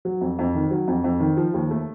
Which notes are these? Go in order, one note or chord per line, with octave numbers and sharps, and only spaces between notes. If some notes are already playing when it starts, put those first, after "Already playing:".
F#3
F2
F2
D#3
F#3
F2
F2
D#3
F3
D#2
A3